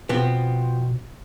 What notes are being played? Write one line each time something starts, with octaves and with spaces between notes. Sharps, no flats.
B2 F3 B3 C4